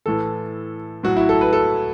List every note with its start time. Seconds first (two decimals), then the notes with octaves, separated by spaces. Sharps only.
0.06 A2 E3 A4
1.03 A2 F#3 F#4
1.17 E4
1.29 A4
1.41 B4
1.53 A4